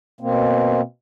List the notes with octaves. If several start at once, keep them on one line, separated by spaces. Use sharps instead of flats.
B2 A#3 C4